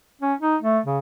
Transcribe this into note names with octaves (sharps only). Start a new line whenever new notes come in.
C#4
D#4
A3
C#3